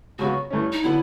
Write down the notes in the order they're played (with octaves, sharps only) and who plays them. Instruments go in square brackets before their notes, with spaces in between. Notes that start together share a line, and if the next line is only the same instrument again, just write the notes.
[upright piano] C#2 C#3 F#3 B3 [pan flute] F#4
[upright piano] G2 E3 A3 C#4
[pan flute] D#4
[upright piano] D3 F#3 B3 [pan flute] E4